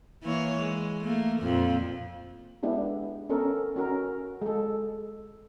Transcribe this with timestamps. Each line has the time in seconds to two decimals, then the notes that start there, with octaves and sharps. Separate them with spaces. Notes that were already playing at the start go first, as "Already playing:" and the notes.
0.23 E3 A#3 C#5
0.58 G#3
1.04 A3 A#3
1.40 F2 A#2
2.63 G#3 B3 D4 E4 G4
3.29 B3 C#4 A4 A#4
3.76 C#4 F#4 A#4
4.42 G#3 A4